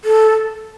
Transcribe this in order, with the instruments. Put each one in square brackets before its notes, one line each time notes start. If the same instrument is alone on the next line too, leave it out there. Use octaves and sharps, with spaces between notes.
[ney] A4